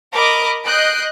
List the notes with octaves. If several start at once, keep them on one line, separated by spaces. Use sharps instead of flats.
A#4 D#5 B5 D6
D#5 F#6 G6 C7 D7